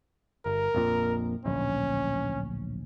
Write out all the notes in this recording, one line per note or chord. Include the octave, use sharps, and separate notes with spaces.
G1 A#4
A#1 F2 A#2
D1 A#1 C#4